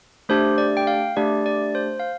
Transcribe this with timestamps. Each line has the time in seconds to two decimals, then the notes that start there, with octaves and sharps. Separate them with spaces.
0.29 A3 D4 G4 C5
0.58 D5
0.77 G5
0.87 F5
1.16 A3 D4 G4 D5
1.46 D5
1.75 C5
2.00 F5